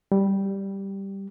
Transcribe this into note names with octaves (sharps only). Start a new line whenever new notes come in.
G3